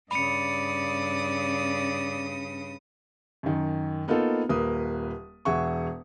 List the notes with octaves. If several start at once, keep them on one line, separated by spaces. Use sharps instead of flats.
G2 C#3 D5 B5 D#6 C#7
F#2 D#3
A#3 B3 D#4 F4 A4
D#1 A#3 B4 D#6
E1 G#4 E5 F#5 C#6